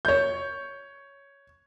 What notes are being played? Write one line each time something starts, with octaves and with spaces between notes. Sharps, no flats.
C#5 G6